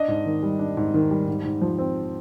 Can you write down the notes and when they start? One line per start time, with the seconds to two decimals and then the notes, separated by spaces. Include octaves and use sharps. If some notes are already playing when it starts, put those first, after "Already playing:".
Already playing: D4 D#5
0.08 G#2
0.26 D#3
0.43 G3
0.59 D4
0.77 G#2
0.94 D#3
1.11 G3
1.28 G#2
1.45 G#2
1.61 F3
1.78 C4